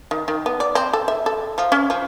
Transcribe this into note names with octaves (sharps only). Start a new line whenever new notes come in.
D#3
D#3
B3
D5
C4
A4
E5
A4
F3
C#4
F3